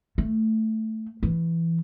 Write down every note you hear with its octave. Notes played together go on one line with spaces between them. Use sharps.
A3
E3